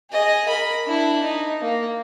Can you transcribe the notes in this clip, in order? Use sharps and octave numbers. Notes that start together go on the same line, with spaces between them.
G#4 D#5
A#4 B5
D4 E4
D#4
A#3